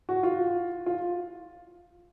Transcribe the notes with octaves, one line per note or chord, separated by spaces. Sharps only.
F#4
F4
F4